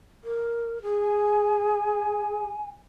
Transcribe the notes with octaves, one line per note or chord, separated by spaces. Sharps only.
A#4
G#4
G#5